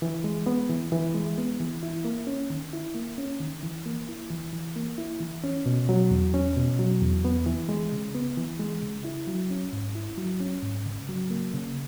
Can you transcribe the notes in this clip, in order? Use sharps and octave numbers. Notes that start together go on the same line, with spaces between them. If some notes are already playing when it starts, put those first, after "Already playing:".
E3
G#3
B3
E3
E3
G#3
B3
E3
E4
A#3
C#4
D#3
E4
A#3
C#4
D#3
E3
A#3
E4
E3
E3
A#3
E4
E3
C#4
B2
F#3
E2
C#4
B2
F#3
E2
B3
E3
G#3
C#3
B3
E3
G#3
C#3
E4
F#3
C#4
G#2
E4
F#3
C#4
G#2
C#3
F#3
A#3
C#3